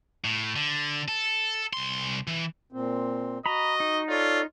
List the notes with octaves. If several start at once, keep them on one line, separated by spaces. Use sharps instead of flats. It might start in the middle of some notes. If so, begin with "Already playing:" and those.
A2
D3
A4
C2 C6
E3
A#2 C4
F#4 D#5 A#5 B5
D#4
F4 A4 C#5 D5